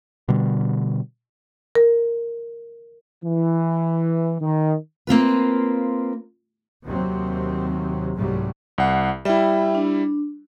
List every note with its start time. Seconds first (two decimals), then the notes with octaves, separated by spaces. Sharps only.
0.28 B2 D3 G3
1.75 A#4
3.24 E3
4.41 D#3
5.07 A#3 C4 F4 B4
6.85 D#2 C3 F#3 C4
8.16 C2 G#2 C3 F#3 G3 A3
8.78 C2 F#5
9.25 G3 E4 E5 G5
9.75 D4